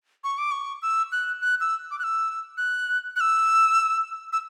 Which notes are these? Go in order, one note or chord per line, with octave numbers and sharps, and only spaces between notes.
C#6
D6
C#6
E6
F#6
F#6
E6
D6
F#6
E6
F#6
F#6
E6
E6